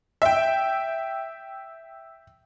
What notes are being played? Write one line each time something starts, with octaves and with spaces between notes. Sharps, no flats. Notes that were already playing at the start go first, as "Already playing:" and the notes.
E5 G5